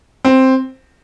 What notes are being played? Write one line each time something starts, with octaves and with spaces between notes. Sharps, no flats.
C4